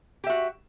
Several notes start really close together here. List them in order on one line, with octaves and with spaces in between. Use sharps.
G4 E5 F#4